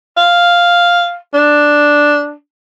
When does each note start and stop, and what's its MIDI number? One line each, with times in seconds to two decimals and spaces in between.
0.17 1.16 77
1.34 2.33 62